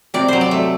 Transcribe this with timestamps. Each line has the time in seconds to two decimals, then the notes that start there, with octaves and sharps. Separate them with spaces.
0.14 C3 D5
0.28 F#3 C5
0.41 D5
0.51 A3